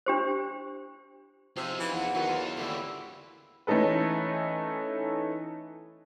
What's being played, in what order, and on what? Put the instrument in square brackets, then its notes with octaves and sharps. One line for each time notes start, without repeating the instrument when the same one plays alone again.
[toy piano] D4 G4 C5
[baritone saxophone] C3 [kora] F3 G#4 E5 [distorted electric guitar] D#4 F4
[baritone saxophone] E3
[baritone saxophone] E2 [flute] F#5
[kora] D#3 E3 F#3 [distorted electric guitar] D#4
[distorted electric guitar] E3 [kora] F4 [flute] C#5
[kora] A2 D3 G3 [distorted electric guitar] A#3 C#4 [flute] E4
[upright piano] E3 A3 C#4 D#4 A4 B4